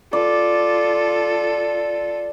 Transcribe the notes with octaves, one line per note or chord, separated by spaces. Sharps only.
F4 A4 D5